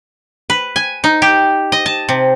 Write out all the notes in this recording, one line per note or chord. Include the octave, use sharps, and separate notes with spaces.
B4
G#5
D#4
G4
D#5
A5
C3